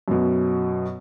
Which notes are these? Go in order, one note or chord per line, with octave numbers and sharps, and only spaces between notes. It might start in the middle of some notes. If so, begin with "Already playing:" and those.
F#2 B2